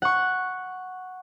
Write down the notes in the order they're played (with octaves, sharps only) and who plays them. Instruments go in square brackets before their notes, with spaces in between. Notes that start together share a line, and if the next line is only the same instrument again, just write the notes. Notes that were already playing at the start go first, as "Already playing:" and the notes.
[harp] F#5 C#6